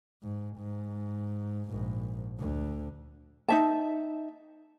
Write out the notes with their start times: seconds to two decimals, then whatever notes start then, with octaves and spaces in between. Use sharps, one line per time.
0.23 G#2
0.57 G#2
1.69 A#1 G#2
2.39 D2 D3
3.48 D#4 E5 A5